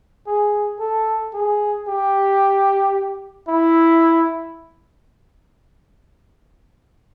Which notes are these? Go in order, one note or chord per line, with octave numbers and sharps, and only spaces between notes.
G#4
A4
G#4
G4
E4